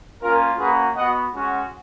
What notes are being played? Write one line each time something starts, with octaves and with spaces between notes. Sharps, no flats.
A#3 C#4 F4 A#4
A#3 C#4 F#4 G#4 B4
B3 F#4 D#5 F#5
G#3 C#4 F#4